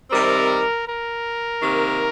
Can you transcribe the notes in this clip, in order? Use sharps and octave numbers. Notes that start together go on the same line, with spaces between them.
C3 D#3 G3 C4 A#4
A#4
C3 D#3 A#3